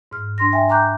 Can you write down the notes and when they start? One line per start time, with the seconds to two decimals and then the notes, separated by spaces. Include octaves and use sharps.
0.11 G#2 F6
0.38 D4 C6 A#6
0.52 E5 G5 G#5
0.69 G5 A#5 C#6 D6 F#6 G6